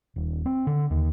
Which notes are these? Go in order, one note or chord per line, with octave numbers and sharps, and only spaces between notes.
D#1
C4
D3
D#2